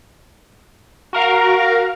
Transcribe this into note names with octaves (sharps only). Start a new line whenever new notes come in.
F#4 A#4 F5 A#5